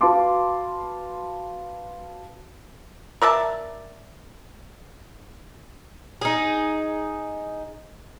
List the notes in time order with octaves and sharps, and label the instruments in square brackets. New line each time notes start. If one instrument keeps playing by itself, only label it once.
[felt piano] F#4 B4 F5 A5 C6 D6
[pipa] A#4 D5 E5 A5
[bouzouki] D#4 G#4